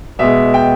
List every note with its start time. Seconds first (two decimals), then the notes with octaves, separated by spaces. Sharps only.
0.19 B2 G#3 E5
0.54 G5